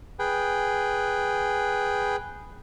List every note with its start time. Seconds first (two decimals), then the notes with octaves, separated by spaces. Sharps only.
0.19 G#4 B4 G5